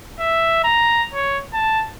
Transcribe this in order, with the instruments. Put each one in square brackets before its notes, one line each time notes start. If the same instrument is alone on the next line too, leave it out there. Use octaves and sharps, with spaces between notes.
[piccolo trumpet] E5
A#5
C#5
A5